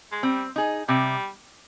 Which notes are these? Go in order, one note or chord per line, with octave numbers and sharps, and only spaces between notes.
G#3
G3 C4
D#4 G#4
C3 G3